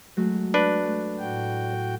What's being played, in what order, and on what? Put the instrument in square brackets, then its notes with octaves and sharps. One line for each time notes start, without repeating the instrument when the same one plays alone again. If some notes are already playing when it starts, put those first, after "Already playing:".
[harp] F#3 G#3 A3
[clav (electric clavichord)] D4 B4
[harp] A3
[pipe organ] A2 F#4 G5